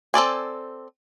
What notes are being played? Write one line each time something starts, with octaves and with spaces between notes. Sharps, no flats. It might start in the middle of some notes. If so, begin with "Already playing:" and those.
C4 A4 D5 G#5